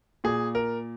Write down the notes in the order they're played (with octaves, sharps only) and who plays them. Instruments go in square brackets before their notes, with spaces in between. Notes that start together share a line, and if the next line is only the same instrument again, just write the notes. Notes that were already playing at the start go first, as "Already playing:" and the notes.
[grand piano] A#2 G#4
A#4